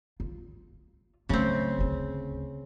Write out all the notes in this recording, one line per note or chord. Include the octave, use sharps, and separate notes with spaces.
F4
C#3 F#3 A3 C4
D2 C#4